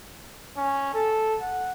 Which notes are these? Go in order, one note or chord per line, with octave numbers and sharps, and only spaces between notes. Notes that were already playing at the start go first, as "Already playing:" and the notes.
C#4
A4
F#5